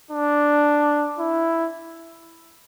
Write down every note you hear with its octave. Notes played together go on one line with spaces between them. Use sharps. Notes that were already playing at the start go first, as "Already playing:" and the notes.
D4
E4